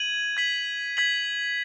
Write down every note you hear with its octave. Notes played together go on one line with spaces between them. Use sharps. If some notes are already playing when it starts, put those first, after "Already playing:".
Already playing: G#6 D#7 F#7
G#6 B6 F#7
G#6 B6 F#7